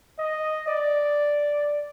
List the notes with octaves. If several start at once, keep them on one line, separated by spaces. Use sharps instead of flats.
D#5
D5